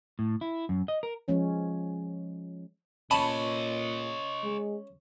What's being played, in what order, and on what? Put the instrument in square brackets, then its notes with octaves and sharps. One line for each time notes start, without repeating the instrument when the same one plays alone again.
[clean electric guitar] A2
E4
F#2
D#5
A#4
[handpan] F3 G#3 C#4 C#5
[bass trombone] A#2 [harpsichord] C#4 [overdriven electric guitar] C#5 D#5 [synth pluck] A5 B5
[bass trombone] G#3